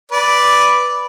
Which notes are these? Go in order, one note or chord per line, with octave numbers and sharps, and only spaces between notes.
B4 D5